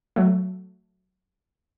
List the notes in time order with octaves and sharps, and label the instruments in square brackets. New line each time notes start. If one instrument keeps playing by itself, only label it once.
[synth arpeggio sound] F#3 A3